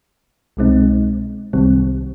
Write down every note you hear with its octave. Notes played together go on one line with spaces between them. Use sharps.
C2 B2 G#3 C4 D#4
C2 C3 D#3 G3 C4